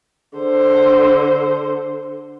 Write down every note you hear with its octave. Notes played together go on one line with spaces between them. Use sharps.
D3 C5